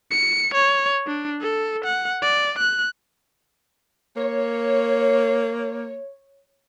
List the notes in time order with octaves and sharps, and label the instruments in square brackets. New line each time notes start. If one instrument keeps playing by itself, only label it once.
[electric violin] C#7
C#5
D4
A4
F#5
D5
F#6
[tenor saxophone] A#3 [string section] C#5